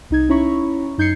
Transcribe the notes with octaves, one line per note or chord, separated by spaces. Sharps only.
C2 D#4 G#6
C#4 E4 C#5 A#5 B5 C#6
F#2 D#4 G6 G#6 C7 C#7